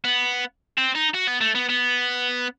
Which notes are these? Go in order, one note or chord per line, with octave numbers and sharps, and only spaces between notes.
B3
C4
D#4
F#4
B3
A3
B3
B3